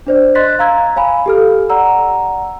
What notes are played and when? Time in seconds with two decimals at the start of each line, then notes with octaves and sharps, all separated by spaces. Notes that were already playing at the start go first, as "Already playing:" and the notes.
0.07 D4 C5 D5
0.35 D#5 C6 F#6 A6 B6
0.59 F5 A#5 E6 G#6
0.96 C#5 F5 G#5 B5
1.26 G4 A4 F6
1.70 D5 F#5 A#5 E6